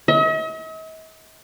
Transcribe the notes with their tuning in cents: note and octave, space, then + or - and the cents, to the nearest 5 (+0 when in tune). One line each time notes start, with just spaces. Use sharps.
D#5 +45